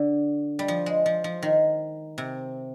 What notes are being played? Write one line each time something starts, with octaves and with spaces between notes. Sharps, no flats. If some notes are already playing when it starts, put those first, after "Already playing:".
Already playing: D3
G3
F3
G#3
F3
F3
D#3
C3